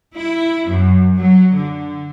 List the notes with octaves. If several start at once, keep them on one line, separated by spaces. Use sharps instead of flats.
E4
F#2
F#3
D3